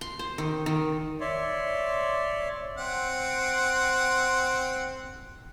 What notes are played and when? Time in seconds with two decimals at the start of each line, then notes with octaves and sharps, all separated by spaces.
0.01 C6
0.19 C5
0.38 D#3
0.66 D#3
1.21 C#5 D5 E5 C6
2.78 C4 F#5